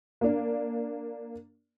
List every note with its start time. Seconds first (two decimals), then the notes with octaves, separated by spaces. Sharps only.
0.21 A#3 D4